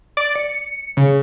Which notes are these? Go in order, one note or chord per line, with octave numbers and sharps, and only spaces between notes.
D5
C#7
C#3